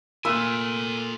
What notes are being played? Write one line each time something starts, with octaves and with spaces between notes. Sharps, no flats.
A#2 A3 F4 G#5 E6